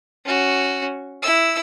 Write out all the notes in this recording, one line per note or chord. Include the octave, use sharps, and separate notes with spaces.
C#4 F#4
E4 E6